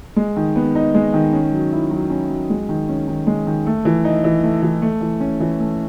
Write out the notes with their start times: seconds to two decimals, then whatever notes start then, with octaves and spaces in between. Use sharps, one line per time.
0.16 G#3
0.36 D#3
0.56 B3
0.75 D#4
0.94 G#3
1.14 D#3
1.33 C#4
1.52 F#3
1.72 E4
1.91 F#3
2.10 C#4
2.29 F#3
2.50 G#3
2.69 D#3
2.89 C#4
3.08 D#3
3.27 G#3
3.47 D#3
3.66 A3
3.85 E3
4.05 D#4
4.24 E3
4.43 A3
4.62 E3
4.82 A3
5.01 E3
5.20 C#4
5.40 E3
5.60 A3